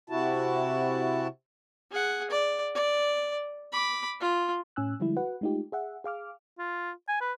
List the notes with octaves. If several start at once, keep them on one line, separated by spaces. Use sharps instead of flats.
C3 E4 F#4 A5
G#4 F#5
D5
D5
B5 D6
F4
A2 C#4 G#5 E6 F#6
D3 F3 G3 G#3 E4
F#4 B4 F#5
G#3 A3 D#4 F4 G4
G#4 E5 F#5
G#4 F5 D6 F6
F4
G#5
B4